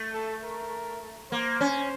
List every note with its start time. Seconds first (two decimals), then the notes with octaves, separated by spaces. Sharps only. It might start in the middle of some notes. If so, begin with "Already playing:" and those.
Already playing: A3
0.14 A4
0.43 A#4
1.31 A#3 C5
1.61 C#4